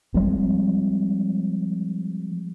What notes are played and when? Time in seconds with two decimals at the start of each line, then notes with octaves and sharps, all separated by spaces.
0.14 F3 G3 G#3 C4